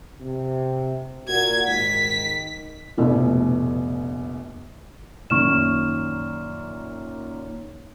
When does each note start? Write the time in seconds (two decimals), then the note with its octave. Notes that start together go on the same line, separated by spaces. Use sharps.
0.21 C3
1.28 A#2 F#4 G#6
1.67 G#2 D#3 B6
2.97 F1 A#1 B2 A3 E4
5.30 F#2 A#2 D#3 C#6 F6 E7